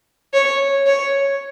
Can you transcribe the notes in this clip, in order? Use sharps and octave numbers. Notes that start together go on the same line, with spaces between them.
C#5
C#5